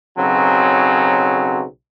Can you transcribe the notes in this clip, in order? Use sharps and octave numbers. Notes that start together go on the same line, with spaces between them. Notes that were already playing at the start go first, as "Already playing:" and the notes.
B1 C#3 F#3 C4